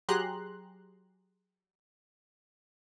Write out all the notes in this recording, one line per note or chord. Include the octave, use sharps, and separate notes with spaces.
F#3 G4 G#4 A#5 C6 F#6